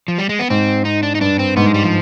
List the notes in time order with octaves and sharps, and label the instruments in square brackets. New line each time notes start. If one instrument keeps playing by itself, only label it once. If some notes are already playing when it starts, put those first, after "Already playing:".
[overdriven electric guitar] F3
G3
G#3
B3
[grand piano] G#2 [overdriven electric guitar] C4
[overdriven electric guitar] D#4
D4
D#4
[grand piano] G2 [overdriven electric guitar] D4
[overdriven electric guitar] C4
[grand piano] G#2 [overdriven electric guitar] B3
[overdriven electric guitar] G#3
G3
F3